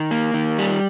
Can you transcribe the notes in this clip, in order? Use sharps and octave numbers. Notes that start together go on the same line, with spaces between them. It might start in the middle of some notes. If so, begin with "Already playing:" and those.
Already playing: D#3
A#3
D#3
G3